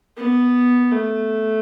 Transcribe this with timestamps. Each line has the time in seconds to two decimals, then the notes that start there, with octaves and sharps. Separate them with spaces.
0.17 B3
0.91 A3